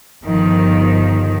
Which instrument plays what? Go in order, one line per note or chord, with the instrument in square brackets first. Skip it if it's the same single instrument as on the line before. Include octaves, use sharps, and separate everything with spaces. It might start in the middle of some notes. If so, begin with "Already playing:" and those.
[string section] G1 D#3 F3